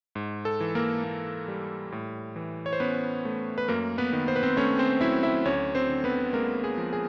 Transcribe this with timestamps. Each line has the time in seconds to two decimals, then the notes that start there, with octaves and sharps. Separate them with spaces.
0.15 G#2
0.45 A4
0.60 E3
0.75 A#3 A#4
1.04 A#3
1.48 G3
1.92 A2
2.36 E3
2.66 C#5
2.73 C5
2.80 B3 C#4 B4
3.25 A3
3.58 B4
3.68 F#2 A#3 A#4
3.98 B3 B4
4.13 D#3
4.28 C5
4.36 B4
4.43 C4 C5
4.57 A3 C#4 C#5
4.79 C4 C5
5.01 F#3 E4 E5
5.23 E4 E5
5.45 D2 C#4 C#5
5.75 C4 C5
5.89 D3
6.04 B3 B4
6.33 G#3 A#3 A#4
6.64 G#4
6.78 F3
6.93 G#4